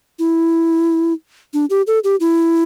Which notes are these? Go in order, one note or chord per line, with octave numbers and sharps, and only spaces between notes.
E4
D4
G4
A4
G4
E4